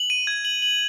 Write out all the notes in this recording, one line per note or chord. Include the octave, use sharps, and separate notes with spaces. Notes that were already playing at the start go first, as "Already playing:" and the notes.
Already playing: F#7
D#7
G#6
F#7
F#7